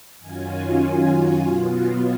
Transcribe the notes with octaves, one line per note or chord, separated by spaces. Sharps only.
F#2 D#3 F#3 C#4 F4 G#5
G#5
B2 F#3 B3 F4